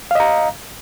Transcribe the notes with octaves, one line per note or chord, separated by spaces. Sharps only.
D#5 F5 A#5